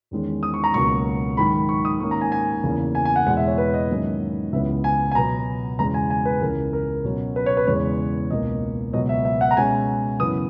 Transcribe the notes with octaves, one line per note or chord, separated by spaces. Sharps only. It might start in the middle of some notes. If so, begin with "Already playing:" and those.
E2 D#3 G#3 C#4
D#6
C#6
A#5
C#2 B2 F#3 A#3 C#4 C#6
G#2 D#3 F#3 B5
C#6
D#6
G#2 D#3 A#3 C#4 C#6
A#5
G#5
G#5
E2 C#3 E3 A#3 C#4
G#5
G#5
F#5
E2 B2 G#3 F#5
E5
C#5
B4
D#5
G#2 D#3 F#3 A#3 C#4
C#2 C#3 E3 B3 E5
G#5
G#5
B2 F#3 B3 A#5
E2 C#3 G#3 B3 A#5
G#5
G#5
B4
C#2 C#3 E3 A#4
A#4
B2 F#3 C#4
B4
C#5
B4
E2 C#3 G#3 C#4 C#5
C#2 B2 A#3 C#4 D#5
C#2 B2 F#3 B3 D#5
E5
E5
F#5
A#5
B2 G#3 C#4 G#5
F#2 C#3 E3 B3 D#6